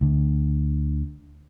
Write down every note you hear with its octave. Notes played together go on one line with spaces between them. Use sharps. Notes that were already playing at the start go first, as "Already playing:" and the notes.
D2 D3